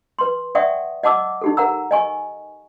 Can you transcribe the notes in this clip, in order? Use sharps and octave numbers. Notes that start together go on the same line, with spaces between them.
B4 C6
D5 E5 F#5 G5 C#6 D#6
D#5 F#5 A5 D6 E6
D#4 G4 A4
A#4 F#5 A#5 E6
D#5 G#5 C#6